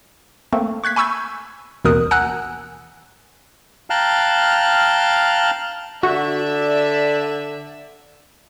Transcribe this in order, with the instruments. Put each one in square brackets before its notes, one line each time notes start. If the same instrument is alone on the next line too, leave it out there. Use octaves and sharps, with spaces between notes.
[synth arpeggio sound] A3 A#3 C4
C#6 F#6 G#6 B6
G#5 B5 C#6 E6 G6 G#6
A1 D#2 B2 A#4 D#6 F#6
F#5 G#5 A#5 E6 F#6
[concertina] F5 G5 A5 A#5 F6 F#6
[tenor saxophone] D3 [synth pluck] F#4 [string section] D5 E5